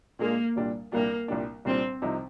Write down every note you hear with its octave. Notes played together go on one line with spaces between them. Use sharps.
A#2 G#3 A#3 D4 G#4
C2 A#2 G3 D4
C2 A#2 G3 A#3 D4
C2 A#2 G3 D4
C2 A#2 G3 C4 D4
C2 C3 F3 C4 D#4